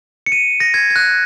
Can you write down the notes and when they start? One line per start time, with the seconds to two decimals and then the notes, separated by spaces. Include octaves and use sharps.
0.26 C#7
0.32 D#7
0.60 A#6
0.74 G#6
0.90 G#6
0.96 F#6